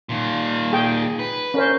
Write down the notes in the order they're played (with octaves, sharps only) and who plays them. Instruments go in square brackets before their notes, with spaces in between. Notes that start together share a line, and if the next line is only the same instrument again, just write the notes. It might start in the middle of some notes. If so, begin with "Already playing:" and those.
[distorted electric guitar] A#2 D#3
[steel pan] G#4 G5
[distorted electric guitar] B4
[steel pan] C#4 A#4 C5